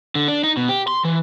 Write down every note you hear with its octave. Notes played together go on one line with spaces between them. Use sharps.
D3
D4
D#4
B2
G4
C6
E3